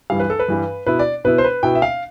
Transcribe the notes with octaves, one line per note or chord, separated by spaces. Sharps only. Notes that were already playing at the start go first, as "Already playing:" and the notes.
G2 E3 G3 F5
B4
A4
B4
G2 E3 G3
B2 B3 E4 B4
D5
B2 B3 E4 B4
C5
B4
B2 B3 E4 G5
E5
F5